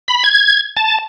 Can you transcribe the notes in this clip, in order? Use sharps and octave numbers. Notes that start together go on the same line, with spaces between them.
B5
G#6
A5